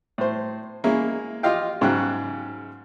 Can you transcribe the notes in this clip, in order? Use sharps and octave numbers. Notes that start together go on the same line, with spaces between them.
A2 C5
G#3 A#3 C#4 E4
F4 G4 D#5 F5 G5
G#2 C#3 F#3 G5 F#6